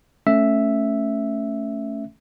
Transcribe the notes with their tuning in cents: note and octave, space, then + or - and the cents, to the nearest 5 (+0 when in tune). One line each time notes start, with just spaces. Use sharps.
A3 +0 C#4 -5 E5 +0